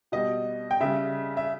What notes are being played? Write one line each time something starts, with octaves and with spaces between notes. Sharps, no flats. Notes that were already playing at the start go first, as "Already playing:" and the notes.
B2 G3 D#5
G5
C#3 G3 E5
E5